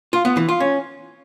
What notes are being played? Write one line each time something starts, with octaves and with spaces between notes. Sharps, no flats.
F4
B3
E3
F4
C#4